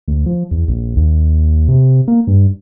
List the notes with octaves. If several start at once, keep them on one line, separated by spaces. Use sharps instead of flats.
D2
F3
E2
A#1
D#2
C3
A#3
G2